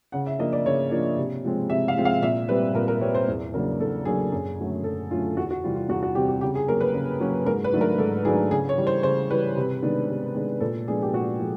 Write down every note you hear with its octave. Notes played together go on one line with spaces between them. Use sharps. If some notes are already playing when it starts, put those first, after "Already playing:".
C#3 F#5
E5
F3 A#3 D4 D#5
D5
C#3 C#5
F3 A#3 D4
C3
F3 G#3 C4
C3 E5
F5
F3 G#3 C4
F5
A#2 E5
G3 C4 B4
A#2 A#4
A#4
G3 C4 C#5
C5
E2
C#3 F#3 A#3 D4 A#4
E2 A4
C#3 F#3 A#3 D4 G#4
F#2 G#4
D3 F#3 A3 C#4
F#2 A4
D3 F#3 A3 C#4 F4
E2 F#4
F#4
C3 E3 G3 C4 F4
F4
E2 F#4
F#4
C3 E3 G3 C4 G4
G4
C#3 G4
G#4
F#3 A#3 C#4 A#4
B4
C#3
F#3 A#3 C#4
G#2 A#4
B4
D#3 F#3 A3 D4
A#4
G#2 A4
D#3 F#3 A3 D4 G#4
C#3 G#4
C#5
E3 G3
C5
C#3 C5
E3 G3 B4
C3
D#3 G#3 B3 D4
C3
D#3 G#3 B3 D4
A#2 A4
F3 G#3 B3 D4 G#4
G4
A#2 F#4
F3 G#3